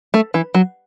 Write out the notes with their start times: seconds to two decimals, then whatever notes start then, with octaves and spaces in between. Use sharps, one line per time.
0.14 A3
0.34 E3
0.55 F#3